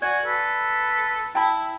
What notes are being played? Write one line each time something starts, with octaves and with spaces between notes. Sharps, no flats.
F#4 D5 G#5 G#6
A4 B4
E4 G5 A5 B5